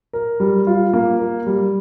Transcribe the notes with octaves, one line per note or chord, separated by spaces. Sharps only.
A#4
G3
F4
A#3
A#4
G3